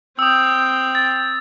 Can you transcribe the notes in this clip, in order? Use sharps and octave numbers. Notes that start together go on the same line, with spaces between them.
C4 G5 D#6 E6
A6